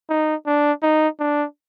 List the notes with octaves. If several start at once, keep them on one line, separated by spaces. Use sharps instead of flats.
D#4
D4
D#4
D4